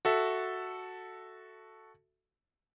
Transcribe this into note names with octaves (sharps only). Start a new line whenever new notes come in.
F#4 A4 E5